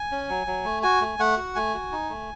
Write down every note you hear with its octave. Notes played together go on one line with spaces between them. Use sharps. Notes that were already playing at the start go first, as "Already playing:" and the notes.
Already playing: G#5
C#4
F#3
F#3
A3
F#4 G#5
A3
A3 F#5
F#4
A3 G#5
F#4
D#4
A3